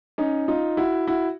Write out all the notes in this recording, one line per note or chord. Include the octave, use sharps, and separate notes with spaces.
C#4 D#4
D#4 F4
E4 F#4
E4 F#4